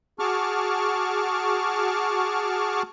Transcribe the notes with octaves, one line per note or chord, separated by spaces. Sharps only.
F#4 G#4 A5 C#6 D6 F6